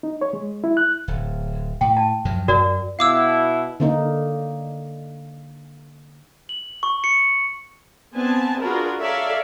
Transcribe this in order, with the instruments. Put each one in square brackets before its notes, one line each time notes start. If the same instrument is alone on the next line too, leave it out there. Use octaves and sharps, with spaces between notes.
[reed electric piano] D#4
C#5
G#3
E4
F#6
[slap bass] D1
[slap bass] A2 [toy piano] G5
[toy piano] A5
[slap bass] F#2 F3 F#3
[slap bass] F#2 [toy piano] F#4 A#4 D5
[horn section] B2 E4 [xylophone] F5 D6 E6
[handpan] D3 A#3 D#4
[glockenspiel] F#7
C#6
C#7
[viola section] B3 C4 D4 G#5 A5
D4 F4 F#4 G#4 A#4 B4
A4 A#4 C#5 D5 E5 F5